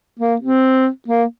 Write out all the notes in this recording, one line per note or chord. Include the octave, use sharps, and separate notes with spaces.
A#3
C4
A#3